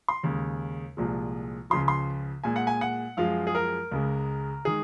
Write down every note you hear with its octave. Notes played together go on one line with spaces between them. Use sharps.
C6
D#2 C#3 G#3
C2 A#2 F3 G#3
C#2 C#3 F3 C6
C6
A#2 G#3 G#5
F#5
G#5
F#5
F#2 F3 G#3 F5
G#4
A#4
C#2 C#3 G#3
D#3 G#3 G#4